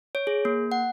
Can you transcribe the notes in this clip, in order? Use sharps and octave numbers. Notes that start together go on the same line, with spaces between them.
C#5
G#4
A#3
F#5